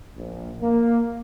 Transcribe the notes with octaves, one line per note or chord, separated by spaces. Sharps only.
A#1
A#3